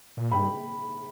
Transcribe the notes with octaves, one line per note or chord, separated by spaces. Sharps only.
A#2
G2 G5 B5